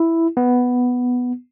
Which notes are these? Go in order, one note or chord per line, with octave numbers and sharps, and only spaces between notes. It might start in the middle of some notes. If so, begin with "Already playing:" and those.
Already playing: E4
B3